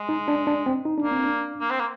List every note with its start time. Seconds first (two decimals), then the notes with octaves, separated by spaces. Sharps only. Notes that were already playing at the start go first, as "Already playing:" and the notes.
Already playing: G#3
0.09 D#4
0.28 D4
0.47 D4
0.66 C4
0.85 D#4
0.98 D4
1.04 A#3
1.12 C4
1.24 D4
1.61 A#3
1.70 C4
1.80 A#3